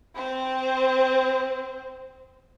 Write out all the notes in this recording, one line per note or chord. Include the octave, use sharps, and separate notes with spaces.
C4 C5